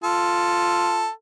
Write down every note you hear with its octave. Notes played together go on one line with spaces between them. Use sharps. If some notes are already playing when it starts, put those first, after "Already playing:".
F4 A4